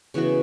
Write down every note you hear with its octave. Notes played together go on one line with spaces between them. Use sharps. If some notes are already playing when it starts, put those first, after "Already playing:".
C#3 E3 B3 F#4